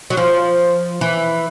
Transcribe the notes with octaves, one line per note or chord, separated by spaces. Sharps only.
F#3
F3
E3